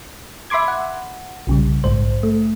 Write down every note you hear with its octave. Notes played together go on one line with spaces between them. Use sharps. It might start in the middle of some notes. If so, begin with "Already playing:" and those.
E5 B5 C6 D6 G#6
F#5
B1 C#3 G3
A#1 G#2 C5
A3